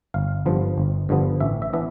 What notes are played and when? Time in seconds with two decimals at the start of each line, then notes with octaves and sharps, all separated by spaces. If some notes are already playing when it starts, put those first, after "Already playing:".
0.14 G1 F5
0.46 G2 D3 F3 B3
0.78 G1
1.09 G2 D3 F3 B3
1.41 A1 E5
1.62 E5
1.73 E3 B3 D4 E5